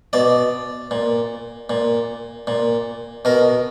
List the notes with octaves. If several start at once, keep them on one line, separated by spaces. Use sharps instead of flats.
B2 D5
A#2
A#2
A#2
B2 A#4